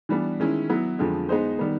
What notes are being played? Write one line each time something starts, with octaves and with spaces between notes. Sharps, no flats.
E3 G3 B3 D4
D#3 G#3 C#4 E4
F#3 B3 E4
F2 D3 F3 G#3
G#3 B3 D#4 G#4 C5
D#3 G3 B3